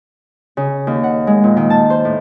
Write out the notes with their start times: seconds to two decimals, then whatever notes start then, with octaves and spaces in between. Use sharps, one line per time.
0.57 C#3
0.87 D#2
1.04 F#5
1.27 G#3
1.44 A#2
1.57 D#3
1.70 A5
1.90 C5
2.05 A2